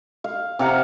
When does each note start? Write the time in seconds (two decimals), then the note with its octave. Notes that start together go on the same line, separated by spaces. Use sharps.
0.24 F5
0.59 C3 F5 F#5 A#5